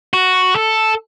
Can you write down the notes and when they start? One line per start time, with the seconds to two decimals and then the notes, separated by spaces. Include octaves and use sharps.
0.14 F#4
0.56 A4